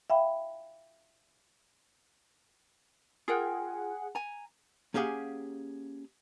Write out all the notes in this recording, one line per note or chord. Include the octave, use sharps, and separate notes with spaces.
E5 F5 G5 B5
F4 G#4 A#4 F#5 G5
G#5 A#5
A#3 C#4 G4 G#4 F5 F#5